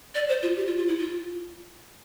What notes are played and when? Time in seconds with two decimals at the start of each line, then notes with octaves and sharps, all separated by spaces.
0.15 D5
0.29 C5
0.43 F4
0.57 G4
0.67 F4
0.77 F4
0.88 E4
0.98 F4